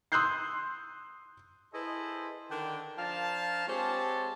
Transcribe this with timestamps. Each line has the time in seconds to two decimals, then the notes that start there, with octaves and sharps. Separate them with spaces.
0.12 C6 D#6 E6 F#6 G6 C7
1.73 E4 G#4 A4 B4 C5 D#5
2.51 D3 D#3 D4 A#4 G5
2.98 F3 D4 A#4 F5 A5
3.68 G#3 C4 G4 C5 C#5 A5